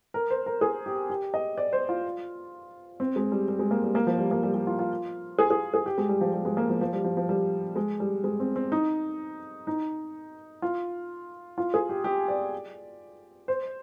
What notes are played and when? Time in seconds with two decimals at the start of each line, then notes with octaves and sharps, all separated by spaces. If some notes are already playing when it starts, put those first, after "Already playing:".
0.14 A#4
0.30 C5
0.46 A#4
0.61 G#4
0.86 G4
1.10 G4
1.34 D#5
1.58 D5
1.73 C5
1.89 F4
3.00 C4
3.16 G#3
3.32 G3
3.48 G3
3.59 G#3
3.71 A#3
3.84 G3
3.95 A#3
4.07 F3
4.19 G3
4.31 A#3
4.43 G3
4.54 G3
4.67 F4
4.79 F4
5.39 G#4
5.50 G#4
5.74 G#4
5.86 G4
5.98 G#3
6.09 G3
6.21 F3
6.33 G3
6.45 G#3
6.57 A#3
6.70 F3
6.81 F3
6.93 G3
7.04 F3
7.17 F3
7.29 G3
7.76 G#3
8.00 G3
8.24 G#3
8.40 C4
8.56 C4
8.72 D#4
9.67 D#4
10.62 F4
11.58 F4
11.74 G#4
11.89 G4
12.04 G4
12.28 D5
13.48 C5